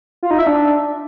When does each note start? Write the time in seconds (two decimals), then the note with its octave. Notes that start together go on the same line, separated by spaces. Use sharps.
0.23 F4
0.31 D#4
0.39 E5
0.47 D4